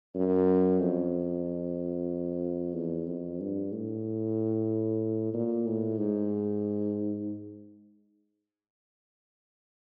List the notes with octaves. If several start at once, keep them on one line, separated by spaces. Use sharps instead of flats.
F#2
F2
E2
F2
G2
A2
A#2
A2
G#2